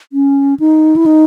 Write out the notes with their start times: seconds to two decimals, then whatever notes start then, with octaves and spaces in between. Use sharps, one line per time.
0.13 C#4
0.60 D#4
0.96 E4
1.06 D#4